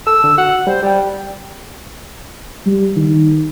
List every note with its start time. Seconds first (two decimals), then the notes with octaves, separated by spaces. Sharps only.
0.07 A4 E6
0.24 D3
0.38 F#4 F#5
0.67 G3 C5
0.83 G3 G4 G5
2.66 G3
2.96 D#3